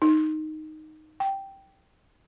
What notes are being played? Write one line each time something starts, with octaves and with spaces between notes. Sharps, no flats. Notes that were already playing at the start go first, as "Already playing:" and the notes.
D#4
G5